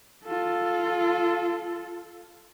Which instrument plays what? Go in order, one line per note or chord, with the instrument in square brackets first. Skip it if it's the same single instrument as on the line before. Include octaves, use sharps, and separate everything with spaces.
[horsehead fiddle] F4 A4